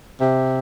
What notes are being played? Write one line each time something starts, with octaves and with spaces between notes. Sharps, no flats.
C3